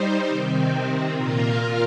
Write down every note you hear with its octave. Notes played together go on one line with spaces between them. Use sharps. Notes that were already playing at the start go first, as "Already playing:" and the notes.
Already playing: G3 D#4 C5
C3 D#3 C4
A#2 A#3 F4 A#4